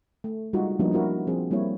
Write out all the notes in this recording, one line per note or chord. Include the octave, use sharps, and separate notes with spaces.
A3
G3 G#3 D#4 F4 F#4
F3 G3 A#3 B3 D4 D#4
D4 E4 F#4 A#4
F3 C4 G#4
G3 A#3 C4 E4 C#5